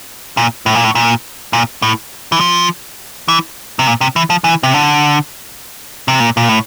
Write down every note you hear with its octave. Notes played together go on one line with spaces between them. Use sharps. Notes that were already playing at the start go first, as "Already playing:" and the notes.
A#2
A2
A#2
A2
A#2
A#2
A2
E3
F3
E3
C3
A#2
C3
E3
F3
E3
C3
D3
C3
A#2
A#2
A2